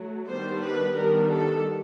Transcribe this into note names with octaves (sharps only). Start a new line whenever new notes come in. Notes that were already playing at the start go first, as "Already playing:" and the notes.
Already playing: F#3 A3
D#3 G3 B3 D4 C5
B4
D#3 G3 B3 D4 A#4
A4